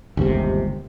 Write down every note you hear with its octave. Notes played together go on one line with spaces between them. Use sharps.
G1 D#2 G#2 C3